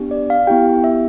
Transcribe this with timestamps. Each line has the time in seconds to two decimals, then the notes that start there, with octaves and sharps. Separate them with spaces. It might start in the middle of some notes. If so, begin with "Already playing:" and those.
Already playing: B3 D4 G4
0.11 D5
0.30 F5
0.47 B3 E4 G4 G5
0.84 E5